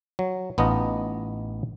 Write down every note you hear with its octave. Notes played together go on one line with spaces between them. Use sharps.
F#3
A1 B3 D#4 F4 D#5